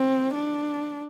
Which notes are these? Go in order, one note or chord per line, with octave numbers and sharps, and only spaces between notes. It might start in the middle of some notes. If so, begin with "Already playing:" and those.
Already playing: C4
D4